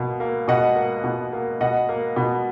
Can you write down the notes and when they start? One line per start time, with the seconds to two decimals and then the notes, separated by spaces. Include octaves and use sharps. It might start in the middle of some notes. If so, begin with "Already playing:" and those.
Already playing: B2 A#3 F5
0.20 A#3
0.48 B2 D#5 F#5
0.76 A#3
1.04 B2
1.33 A#3
1.61 B2 D#5 F#5
1.89 A#3
2.16 B2